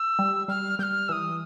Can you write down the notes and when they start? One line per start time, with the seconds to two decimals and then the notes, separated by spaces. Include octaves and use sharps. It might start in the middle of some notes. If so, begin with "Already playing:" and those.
Already playing: E6
0.19 G3
0.48 G3 F6
0.79 G3 F6 G6
1.08 E3 D#6 E6